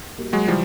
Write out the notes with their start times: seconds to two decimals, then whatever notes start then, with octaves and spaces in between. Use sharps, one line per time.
0.18 B2 G3 A#3
0.33 F#3 G#3
0.48 C#3 E3 F3 G3